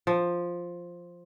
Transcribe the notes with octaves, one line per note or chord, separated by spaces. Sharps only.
F3